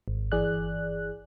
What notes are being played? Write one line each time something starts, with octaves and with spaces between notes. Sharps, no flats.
G#1
G1 E3 G#4 D5 F#6